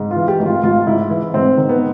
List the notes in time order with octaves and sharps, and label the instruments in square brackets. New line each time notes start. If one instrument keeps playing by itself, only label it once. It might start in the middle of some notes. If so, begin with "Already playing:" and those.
Already playing: [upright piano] G#2
F4
E3
G4
G#1
F4
G#1 F4
G#2 E4
E3 E4
G#2 C4
D#3
B3